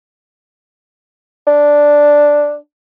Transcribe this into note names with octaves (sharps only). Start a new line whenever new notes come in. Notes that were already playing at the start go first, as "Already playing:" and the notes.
D4